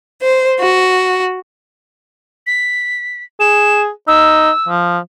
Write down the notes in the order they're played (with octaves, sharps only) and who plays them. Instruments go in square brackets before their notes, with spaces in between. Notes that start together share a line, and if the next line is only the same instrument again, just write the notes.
[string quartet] C5
F#4
[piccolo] B6
[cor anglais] G#4 [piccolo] E7
[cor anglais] D#4 [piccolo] E6
[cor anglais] F3